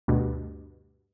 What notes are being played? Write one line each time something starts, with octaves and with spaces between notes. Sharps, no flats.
D2 G2 B2